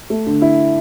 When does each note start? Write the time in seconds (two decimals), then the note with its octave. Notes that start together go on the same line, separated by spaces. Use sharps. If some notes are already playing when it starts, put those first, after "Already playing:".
0.10 A3
0.26 D3
0.42 E4